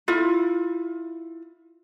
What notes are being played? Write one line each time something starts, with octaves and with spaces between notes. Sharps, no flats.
E4 F4